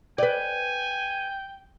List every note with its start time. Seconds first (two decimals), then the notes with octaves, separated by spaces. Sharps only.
0.18 B4 D5 G5 G#5